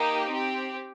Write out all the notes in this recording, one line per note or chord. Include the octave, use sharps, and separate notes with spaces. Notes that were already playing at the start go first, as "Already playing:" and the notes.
Already playing: A#3 D#4 G4
C4 G4